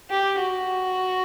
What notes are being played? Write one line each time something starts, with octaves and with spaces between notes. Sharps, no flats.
G4
F#4